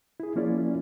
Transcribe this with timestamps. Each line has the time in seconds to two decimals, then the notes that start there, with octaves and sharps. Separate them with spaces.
0.20 E4 G#4
0.36 F3 A#3 C#4 E4 F4 D5